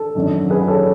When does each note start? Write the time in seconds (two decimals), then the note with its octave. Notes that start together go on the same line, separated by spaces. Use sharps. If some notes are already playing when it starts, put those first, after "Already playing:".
Already playing: A4
0.15 G#1 F#2 D3
0.50 G#4 B4
0.62 B4
0.68 A4 C#5